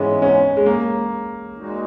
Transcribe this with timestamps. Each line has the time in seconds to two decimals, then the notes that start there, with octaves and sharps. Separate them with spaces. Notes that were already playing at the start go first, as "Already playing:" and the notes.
Already playing: G#2 E3 G#3 B3 C#4
0.22 C#4
0.57 G#3
0.66 A#3
1.56 A#2 G#3 D#4 F#4